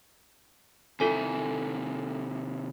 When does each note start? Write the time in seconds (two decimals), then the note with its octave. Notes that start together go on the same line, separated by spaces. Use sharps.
1.00 C3 D#3 E4 F4 A4 G#5